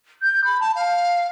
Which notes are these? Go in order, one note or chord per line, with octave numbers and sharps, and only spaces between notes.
G6
B5
A5
F5